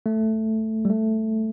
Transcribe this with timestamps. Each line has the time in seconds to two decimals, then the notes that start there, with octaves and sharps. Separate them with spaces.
0.06 A3
0.85 G3
0.90 A3